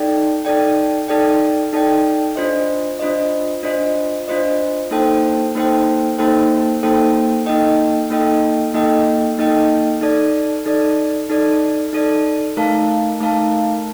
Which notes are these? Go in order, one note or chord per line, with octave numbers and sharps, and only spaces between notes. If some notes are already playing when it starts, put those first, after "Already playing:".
Already playing: D#4 A4 D5 G5
D#4 A4 D5 G5
D#4 A4 D5 G5
D#4 A4 D5 G5
D4 F4 C5 D#5
D4 F4 C5 D#5
D4 F4 C5 D#5
D4 F4 C5 D#5
A#3 D#4 A4 C5 G5
A#3 D#4 A4 C5 G5
A#3 D#4 A4 C5 G5
A#3 D#4 A4 C5 G5
A#3 D#4 A4 D#5 G5
A#3 D#4 A4 D#5 G5
A#3 D#4 A4 D#5 G5
A#3 D#4 A4 D#5 G5
D#4 A4 D5
D#4 A4 D5
D#4 A4 D5
D#4 A4 D5
A3 D#4 A#4 F5 A5
A3 D#4 A#4 F5 A5